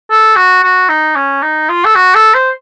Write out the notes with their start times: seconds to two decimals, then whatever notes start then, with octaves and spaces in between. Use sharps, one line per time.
0.11 A4
0.36 F#4
0.63 F#4
0.89 D#4
1.15 C#4
1.42 D#4
1.69 F4
1.85 A4
1.95 F#4
2.15 A4
2.35 C5